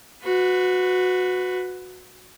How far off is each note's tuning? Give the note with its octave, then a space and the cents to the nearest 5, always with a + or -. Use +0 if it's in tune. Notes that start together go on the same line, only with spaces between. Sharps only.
F#4 -15 B4 +15